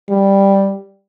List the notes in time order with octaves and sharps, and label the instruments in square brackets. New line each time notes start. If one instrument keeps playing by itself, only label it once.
[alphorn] G3